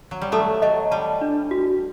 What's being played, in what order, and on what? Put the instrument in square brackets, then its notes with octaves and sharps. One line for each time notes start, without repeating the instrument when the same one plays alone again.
[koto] F#3
G3
[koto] F#3 A3 [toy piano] A4
[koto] F#3 [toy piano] D#5
[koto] G3 [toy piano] A5
[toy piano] D4
F#4